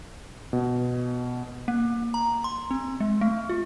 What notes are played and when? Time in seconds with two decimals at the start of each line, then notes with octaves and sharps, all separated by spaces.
0.53 B2
1.68 A#3
2.14 A#5
2.44 C6
2.71 C4
3.00 G#3
3.21 A3
3.49 F4